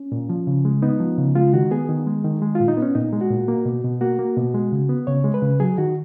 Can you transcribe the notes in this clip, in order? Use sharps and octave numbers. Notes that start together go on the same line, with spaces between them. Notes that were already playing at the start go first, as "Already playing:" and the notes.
Already playing: C#4
A#2
F3
C#3
G#3
B3 D#4
F3
C#3
G#3 F4
D#3 F#4
B3 G#4
D#3
G#3
D#3
G#3
A#2 F4
D#4
B3 C#4
A#2 D#4
G#3
F#4
A#2
A#3
B2
B2
A#3 F#4
A#3
B2
G#3
C#3
B3
C#3 C#5
G#3
B4
C#3
F#3 G#4
D#3 F#4